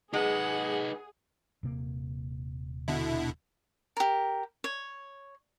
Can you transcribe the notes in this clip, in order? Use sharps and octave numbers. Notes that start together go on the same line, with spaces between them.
G#3 D#4 G#4 B4 F#5
D#1 C3 A#3
B2 D3 E4
G4 A#4
C#5